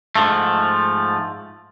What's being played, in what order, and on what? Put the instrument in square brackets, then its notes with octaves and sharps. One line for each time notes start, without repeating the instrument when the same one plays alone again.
[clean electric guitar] G#2 F3 A3